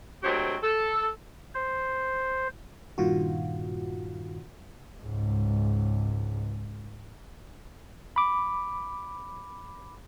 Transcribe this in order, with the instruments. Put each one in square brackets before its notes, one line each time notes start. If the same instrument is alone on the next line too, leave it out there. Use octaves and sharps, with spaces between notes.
[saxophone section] D2 F#3 G#3 C4 G4 C#5
A4
[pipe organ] C5
[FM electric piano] G2 A#2 D#3 F4 F#4
[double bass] C#2 G#2
[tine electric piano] B5 D6